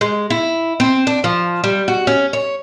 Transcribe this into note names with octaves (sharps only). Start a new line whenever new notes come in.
G#3
E4
C4
D4
F3
G3
F#4
C#4
C#5